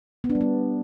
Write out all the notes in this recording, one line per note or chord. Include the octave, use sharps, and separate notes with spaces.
B3
D4
G3
B3